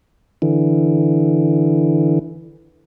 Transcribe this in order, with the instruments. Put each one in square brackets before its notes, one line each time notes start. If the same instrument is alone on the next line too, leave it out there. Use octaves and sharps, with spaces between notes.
[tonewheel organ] D3 E3